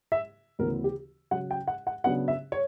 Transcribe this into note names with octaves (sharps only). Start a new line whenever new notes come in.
E5
D2 C#3 E3 B3 A#4
G4
C#3 F#3 C#4 F#5
G5
F#5
F#5
C#3 F#3 B3 D4 F#5
E5
C#5